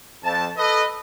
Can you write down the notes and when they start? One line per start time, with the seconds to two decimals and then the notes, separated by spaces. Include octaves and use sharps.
0.24 F2 A5
0.57 A4 B4 D#5